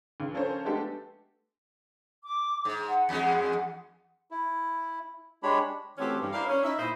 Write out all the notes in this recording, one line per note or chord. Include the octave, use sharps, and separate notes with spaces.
C#2
F3 C#4 A4 A#4 C5 C#5
G#3 A3 B3 D4 G4 A4
D6
G#2
F#5
E2 G#3
E4
G#3 D4 G4 C#5 B5
E3 A3 C4 C#4 F#4 G4
G2
E4 A#4 C5 D5 F5
C#4
D#4 E4 E5
A#2 E4 C5 D#5